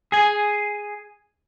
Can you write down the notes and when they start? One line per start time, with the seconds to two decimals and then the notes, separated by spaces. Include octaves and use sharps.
0.12 G#4 G#5